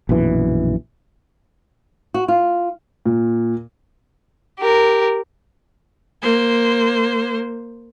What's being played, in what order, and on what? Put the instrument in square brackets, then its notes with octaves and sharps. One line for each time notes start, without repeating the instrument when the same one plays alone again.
[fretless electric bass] A#1 F#2 B2 E3
[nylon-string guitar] F#4
F4
[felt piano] A#2
[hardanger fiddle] G4 A#4
[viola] A#3 C5